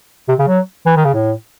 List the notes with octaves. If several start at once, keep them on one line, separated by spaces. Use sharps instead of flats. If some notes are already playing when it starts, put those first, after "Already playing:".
C3
C#3
F#3
E3
D#3
C#3
A2